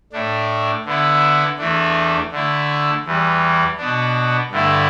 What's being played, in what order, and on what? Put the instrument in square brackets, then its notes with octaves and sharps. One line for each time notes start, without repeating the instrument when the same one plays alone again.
[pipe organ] A2 A3 D4
D3 B3 E4
E2 E3 A3 D4
D3 A3 E4
E2 E3 G3
B2 B3 D4
G2 D3 A3 E4